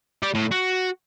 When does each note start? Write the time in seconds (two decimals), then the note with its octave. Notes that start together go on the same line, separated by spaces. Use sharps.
0.23 G4 D5
0.35 A2
0.52 F#4